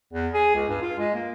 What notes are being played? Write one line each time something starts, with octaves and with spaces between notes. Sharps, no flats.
E2
G#4
C#2
G2
F4
G#3
A#3